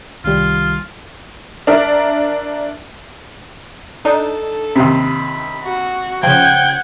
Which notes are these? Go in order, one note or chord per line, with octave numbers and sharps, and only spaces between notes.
C2 D#3 G3 F4
D4 A#4 E5
D4 D#4 A4
D#2 C3 B5
F#4
C#3 F3 F#5 G5 G6 G#6